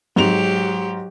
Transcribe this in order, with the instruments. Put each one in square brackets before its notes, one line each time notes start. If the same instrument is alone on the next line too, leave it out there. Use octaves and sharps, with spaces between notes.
[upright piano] G#2 F7 [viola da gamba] F#3 G4